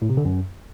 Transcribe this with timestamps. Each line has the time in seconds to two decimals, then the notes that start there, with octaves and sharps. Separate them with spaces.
0.02 A2
0.10 C3
0.17 D3
0.25 F#2